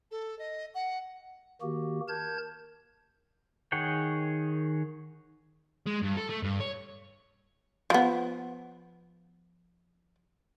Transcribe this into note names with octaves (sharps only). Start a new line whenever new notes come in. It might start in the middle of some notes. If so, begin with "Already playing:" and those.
A4
D#5
F#5
D#3 A#3 F#4 G4
A#4 A5 G6 G#6
D#3 G#4 C#5 F#5 G5
G#3
G2
A4
A3
G2
C#5
F3 B3